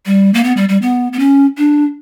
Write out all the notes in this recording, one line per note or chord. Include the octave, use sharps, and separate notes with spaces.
G3
A#3
B3
G3
G3
B3
B3
C#4
D4